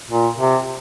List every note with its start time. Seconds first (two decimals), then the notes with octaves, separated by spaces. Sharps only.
0.10 A#2
0.38 C3